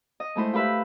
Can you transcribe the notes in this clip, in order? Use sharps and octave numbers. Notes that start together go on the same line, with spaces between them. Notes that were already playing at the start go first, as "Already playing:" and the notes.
D#5
G#3 A3 E4 C5
F4 G4 B4 E5